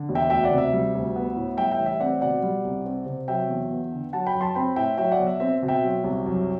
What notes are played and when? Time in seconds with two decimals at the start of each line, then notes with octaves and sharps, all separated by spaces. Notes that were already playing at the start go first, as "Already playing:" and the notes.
Already playing: D3
0.09 E1
0.15 E5 G5
0.30 D2 E5 G5
0.44 D5 F#5
0.51 C3
0.58 E5
0.73 G3
0.95 D2
1.16 B3
1.36 A2
1.57 G3 E5 G5
1.72 E5 G5
1.78 A1
1.86 E5
2.00 C4 D5 F#5
2.21 B2 D5 F#5
2.43 G3
2.65 C2
2.86 C4
3.06 C3
3.28 F#3 E5 G5
3.49 E2
3.71 B3
3.92 D3
4.13 F#3 F#5 A5
4.27 G5 B5
4.35 F#2
4.41 A5 C6
4.55 C4 G5 B5
4.76 A2 E5 G5
4.98 F#3 E5 G5
5.12 D5 F#5
5.20 B1
5.27 E5
5.40 C4 E5
5.62 B2
5.68 E5 G5
5.83 F#3
6.04 C2
6.26 F#2